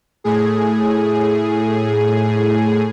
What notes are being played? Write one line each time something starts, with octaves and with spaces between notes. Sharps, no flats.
A2 G#4